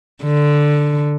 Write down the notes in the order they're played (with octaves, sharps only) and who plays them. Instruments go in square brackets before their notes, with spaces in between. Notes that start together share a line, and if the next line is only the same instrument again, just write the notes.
[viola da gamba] D3